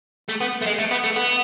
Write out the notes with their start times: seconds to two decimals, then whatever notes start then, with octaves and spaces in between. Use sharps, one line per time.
0.29 A3
0.41 B3
0.62 A3
0.66 G#3
0.79 A3
0.91 B3
1.04 A3
1.16 B3